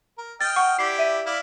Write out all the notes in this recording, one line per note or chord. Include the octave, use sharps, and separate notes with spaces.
A#4
D#5 G5 F6 A6
F#5 C#6
E4 G4 D5 C7
E5 D#7
E4 D5 F5